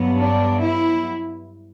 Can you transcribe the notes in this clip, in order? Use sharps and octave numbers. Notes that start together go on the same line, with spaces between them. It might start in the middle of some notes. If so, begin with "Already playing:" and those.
Already playing: G2 F#3 B3
D4
E4